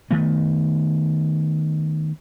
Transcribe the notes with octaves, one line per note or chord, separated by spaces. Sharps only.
D#3 A3 B3